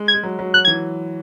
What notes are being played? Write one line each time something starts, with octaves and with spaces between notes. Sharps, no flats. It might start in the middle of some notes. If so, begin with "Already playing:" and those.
Already playing: G#3
G#6
G#3
F#3
F#3
F#3 F#6
G#6
E3